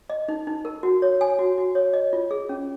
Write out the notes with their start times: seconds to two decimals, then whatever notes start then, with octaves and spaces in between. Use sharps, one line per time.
0.10 D#5
0.28 D#4
0.47 D#4
0.65 A#4
0.83 F#4
1.02 C#5
1.21 G#5
1.39 F#4
1.58 F#4
1.75 C#5
1.93 D#5
2.13 F4
2.31 G#4
2.49 C#4